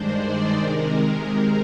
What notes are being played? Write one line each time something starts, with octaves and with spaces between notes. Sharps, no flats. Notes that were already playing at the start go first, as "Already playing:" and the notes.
Already playing: G2 D#3 G#3 D4 C5
D5
C3 D#3 G#3 A#4